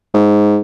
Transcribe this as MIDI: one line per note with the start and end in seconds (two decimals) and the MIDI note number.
0.14 0.60 44